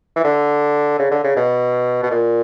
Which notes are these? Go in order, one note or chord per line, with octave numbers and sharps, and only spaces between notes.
E3
D3
C#3
D3
C#3
B2
B2
A#2